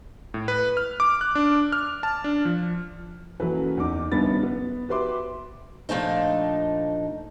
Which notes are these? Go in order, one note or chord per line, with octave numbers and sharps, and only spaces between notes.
A2
B4
F6
D6
F#6
D4
F6
A5
D4
F3
F#2 E3 F#3 A#3 A4 B4
E2 D#4 D6
F#1 G2 D#3 B3 B5 A6
B3
F#4 G4 B4 E5 C6 D6
A#2 F3 A3 D4 D#4